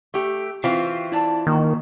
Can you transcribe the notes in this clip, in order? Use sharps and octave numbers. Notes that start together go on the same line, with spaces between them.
A3 G4
E3 C4 F4 F#4 E5 F5
E4 D5 A5
D#3 A#3 F#4